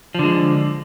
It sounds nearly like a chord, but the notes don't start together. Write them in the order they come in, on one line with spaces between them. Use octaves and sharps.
F3 D3 G#3